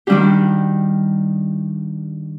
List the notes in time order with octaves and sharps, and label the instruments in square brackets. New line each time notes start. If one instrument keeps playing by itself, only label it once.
[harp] D#3 G3 D4 G4